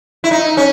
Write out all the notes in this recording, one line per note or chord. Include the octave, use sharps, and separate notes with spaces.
E4
D#4
C#4